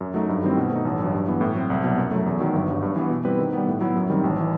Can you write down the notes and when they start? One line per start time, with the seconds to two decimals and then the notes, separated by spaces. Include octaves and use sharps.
0.01 F#2
0.14 F#3 A3 D#4
0.29 G2
0.43 D#3 G3 C4 E4
0.57 B2
0.71 A3 D#4
0.85 A1
0.99 G2 F#3
1.13 G2
1.27 E3 B3
1.41 A2
1.55 F#3 C4
1.70 C2
1.84 B2 F#3
1.98 F#2
2.11 F#3 A3
2.26 E2
2.40 D#3 F#3
2.53 G1
2.69 G2 F#3
2.82 G2
2.96 E3 B3
3.10 B2
3.25 G3 C4 E4 B4
3.39 D#3
3.53 G3 B3
3.67 A2
3.81 F#3 B3 E4
3.95 F#2
4.10 D#3 G3 C4
4.24 A1
4.40 E3